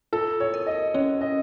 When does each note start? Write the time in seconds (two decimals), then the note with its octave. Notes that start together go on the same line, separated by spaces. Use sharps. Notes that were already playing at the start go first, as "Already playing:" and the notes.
0.13 F4 A4
0.40 C#5
0.54 A#4
0.67 D#5
0.94 C#4 C#5
1.21 D#5